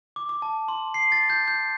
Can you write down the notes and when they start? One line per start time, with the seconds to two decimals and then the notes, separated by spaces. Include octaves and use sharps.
0.16 D6
0.29 D6
0.42 A5
0.68 C6
0.94 C7
1.12 A6
1.30 G6
1.48 G6